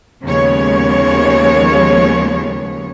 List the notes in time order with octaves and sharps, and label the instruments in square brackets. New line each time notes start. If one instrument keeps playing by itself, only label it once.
[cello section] D#2 C#3 F3 G#3 B3 C#5